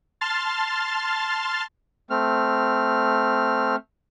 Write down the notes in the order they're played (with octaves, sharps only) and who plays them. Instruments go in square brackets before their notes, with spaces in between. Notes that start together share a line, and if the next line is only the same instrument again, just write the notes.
[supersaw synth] A5 C6 F6 A6
[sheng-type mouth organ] A3 C4 F6